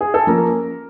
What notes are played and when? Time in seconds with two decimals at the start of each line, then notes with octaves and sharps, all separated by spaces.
0.01 G#4
0.14 A4
0.27 F3 A#3 C#4 A#4